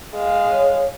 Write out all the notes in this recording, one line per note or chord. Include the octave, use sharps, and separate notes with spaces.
G#3 F5
C#5